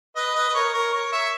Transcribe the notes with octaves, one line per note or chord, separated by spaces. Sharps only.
B4 D#5
B4 D#5
B4
A#4 C#5
A#4 C#5
A#4 C#5
C#5 E5